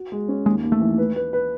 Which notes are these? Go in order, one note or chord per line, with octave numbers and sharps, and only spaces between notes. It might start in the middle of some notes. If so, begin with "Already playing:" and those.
Already playing: F#4
G#3
C#4
D#2 G#3
D#2
A3
E3
B4
B4
B4